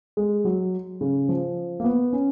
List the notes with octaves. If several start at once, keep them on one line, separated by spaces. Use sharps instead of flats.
G#3
F#3
C#3
F3
A#3
B3
C#4